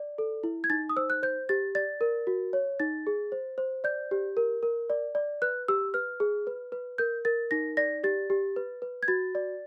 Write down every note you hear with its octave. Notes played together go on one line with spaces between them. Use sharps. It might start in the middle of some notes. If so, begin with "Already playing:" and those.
Already playing: D5
A4
E4
G#6
D#4 A6
D#6
C5 E6
F#6
C5 G6
G4 A6
D5 A6
A#4
F#4
C#5
D#4 A6
G#4
C5
C5
D5 G6
G4
A#4
A#4
D5
D5
B4 F#6
G4 E6
B4 F6
G#4
B4
B4
A#4 G6
A#4 A6
D#4 A#6
D5 A#6
G4 A6
G4
B4
B4
G#6
F#4 A6
D5